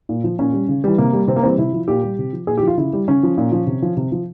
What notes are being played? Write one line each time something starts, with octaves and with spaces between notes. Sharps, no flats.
A#2
F3
A#2 C#4
G3
C#3
E3 G3
C3 A#3
G3
C3 C4
A#3
E3 G3 C4
C3 E4
F3
A#2 G4
G3
C3
F3
A#2 G#4
G4
F3 F4
C#3 E4
G3
C#3 C#4
F3
A#2
F3
C3
F3
C3
F3